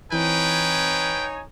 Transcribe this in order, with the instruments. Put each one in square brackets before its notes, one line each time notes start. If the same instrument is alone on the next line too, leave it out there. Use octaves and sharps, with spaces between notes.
[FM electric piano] E3 C4 [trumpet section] D#4 C#5 G#5 [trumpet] B4 [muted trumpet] G5